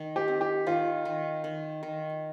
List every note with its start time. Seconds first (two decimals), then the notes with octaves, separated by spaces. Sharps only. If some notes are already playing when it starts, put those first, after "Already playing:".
Already playing: D#3
0.16 G4
0.28 C4
0.41 G4
0.67 D#3 F4
1.05 D#3
1.44 D#3
1.83 D#3